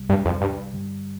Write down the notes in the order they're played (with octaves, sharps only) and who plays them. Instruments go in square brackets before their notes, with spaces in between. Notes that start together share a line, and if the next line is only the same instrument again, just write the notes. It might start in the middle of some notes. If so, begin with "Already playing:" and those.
Already playing: [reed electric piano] C2 C3 G3
[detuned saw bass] G2
F2
G2
[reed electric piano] G2 D3 G3